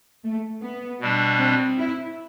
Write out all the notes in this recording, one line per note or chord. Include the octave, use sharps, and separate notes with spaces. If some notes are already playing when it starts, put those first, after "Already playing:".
A3
B3
B2 G3 D4
C4
E4